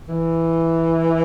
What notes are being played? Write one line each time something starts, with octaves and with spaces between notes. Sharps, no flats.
E3